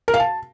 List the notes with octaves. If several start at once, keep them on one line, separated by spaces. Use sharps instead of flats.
A#4
F5
A5